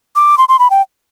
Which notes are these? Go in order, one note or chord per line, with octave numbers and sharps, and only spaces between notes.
D6
C6
C6
B5
G5